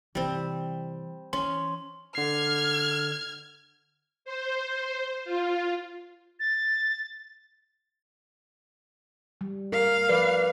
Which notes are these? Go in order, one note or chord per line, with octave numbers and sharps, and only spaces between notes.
C3 E3 G3 C4
E3 C#4 C6
D3 F6 G#6 C7
C5
F4
A6
G3
A#4 F5
F3 B4 D5